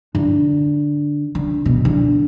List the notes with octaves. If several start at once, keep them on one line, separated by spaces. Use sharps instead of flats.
D3
D3
B2
D3